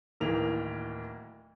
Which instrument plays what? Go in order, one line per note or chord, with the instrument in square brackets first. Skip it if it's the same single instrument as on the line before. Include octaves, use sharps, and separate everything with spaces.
[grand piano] D1 D#3 E3 A#3 F7